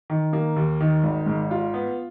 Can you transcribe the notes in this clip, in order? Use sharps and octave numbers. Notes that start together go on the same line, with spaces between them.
D#3
A#3
D#2
D#3
G#1
G#2
F4
B3